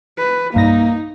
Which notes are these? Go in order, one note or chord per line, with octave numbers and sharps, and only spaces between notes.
B4
B1 G2 A#3 D#4 A#6